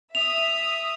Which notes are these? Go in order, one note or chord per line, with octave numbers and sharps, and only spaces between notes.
E5 D#6 F7